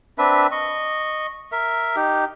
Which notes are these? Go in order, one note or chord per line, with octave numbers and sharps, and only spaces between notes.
C4 D4 B4 E5
D#5 C#6
A#4 E5
D#4 G4